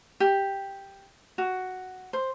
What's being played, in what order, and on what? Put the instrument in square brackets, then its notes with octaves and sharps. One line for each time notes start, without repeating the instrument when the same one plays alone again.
[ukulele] G4
F#4
C5